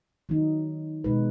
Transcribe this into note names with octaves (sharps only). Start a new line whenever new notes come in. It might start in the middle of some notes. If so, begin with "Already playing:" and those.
D#3 F#3 D#4
B2 G#3 D#4 B4